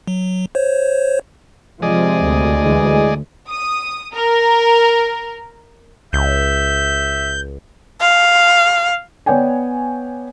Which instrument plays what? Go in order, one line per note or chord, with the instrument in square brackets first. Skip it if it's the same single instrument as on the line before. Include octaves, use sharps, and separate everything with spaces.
[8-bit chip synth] F#3
C5 C#5
[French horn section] C3 G#3 [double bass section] F3 [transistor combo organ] G#4 D5 D#5
[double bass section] D2
[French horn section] E3 G#3
[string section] D#6
A#4
[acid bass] C#2 [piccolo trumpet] E5 [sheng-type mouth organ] G6
[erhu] F5
[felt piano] B3 C#5 D5 G5 G#5